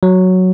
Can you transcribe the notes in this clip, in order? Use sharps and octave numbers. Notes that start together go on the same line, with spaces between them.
F#3